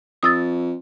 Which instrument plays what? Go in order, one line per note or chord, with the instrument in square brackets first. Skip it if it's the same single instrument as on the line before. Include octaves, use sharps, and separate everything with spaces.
[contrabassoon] F2 [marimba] D#6 E6 A6